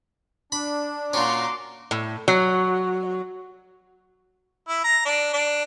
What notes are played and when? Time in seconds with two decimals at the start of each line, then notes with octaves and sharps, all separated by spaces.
0.52 D4 B5
1.13 A#2 C#4 F#4 A#5 C6 D6
1.91 A2
2.28 F#3
4.69 E4
4.84 A#5
5.05 D4
5.33 D4